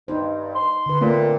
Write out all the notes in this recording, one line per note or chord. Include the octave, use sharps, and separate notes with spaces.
G2 D#4 C5
C6
D3 B4
A#2 A3 A#3 C4